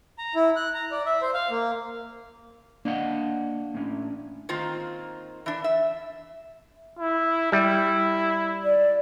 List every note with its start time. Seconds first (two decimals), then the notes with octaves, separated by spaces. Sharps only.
0.19 A#5
0.35 E4
0.56 F#6
0.74 A#5
0.91 D5
1.06 E5
1.22 C5
1.34 F5
1.51 A#3
2.85 A#3 D4 D#5 F#5
3.74 A2 C#4
4.49 D#3 A#3 C4 F4
5.46 E3 D4
5.64 E5
6.99 E4
7.52 G3 E4
8.64 D5